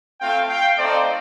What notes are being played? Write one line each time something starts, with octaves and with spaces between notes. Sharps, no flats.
A3 C4 F4 F5 G5
F5 G5
A3 C4 D#4 C5 D5